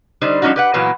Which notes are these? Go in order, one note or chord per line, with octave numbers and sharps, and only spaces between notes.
D3 G3 D#4 C5
F3 G3 G#3 C#4 D#4 F#4
G4 B4 F#5
A#2 E3 F#3 A#3 B3 B4